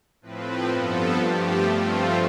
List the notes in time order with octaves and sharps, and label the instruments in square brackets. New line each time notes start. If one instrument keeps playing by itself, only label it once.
[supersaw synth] A2 F3 C4 B4
G2 F3 B3 A4
G2 F3 A3 G4
G2 F3 A3 C4 F4